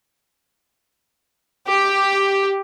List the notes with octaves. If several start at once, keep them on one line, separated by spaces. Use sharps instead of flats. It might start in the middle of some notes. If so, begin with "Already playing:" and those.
G4